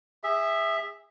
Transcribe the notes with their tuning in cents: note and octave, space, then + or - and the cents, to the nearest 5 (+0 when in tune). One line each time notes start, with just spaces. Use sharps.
G#4 -30 E5 +0